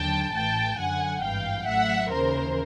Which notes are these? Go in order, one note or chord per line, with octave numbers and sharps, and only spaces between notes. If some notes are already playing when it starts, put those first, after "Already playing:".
Already playing: D#2 D3 F#3 G5 A5
A1 A2 E3 G5 A5
F#2 D3 F#3 F#5 G#5
G#1 G2 E3 F5 G5
A1 A2 F#3 E5 F#5
D#2 C#3 E3 A#4 C5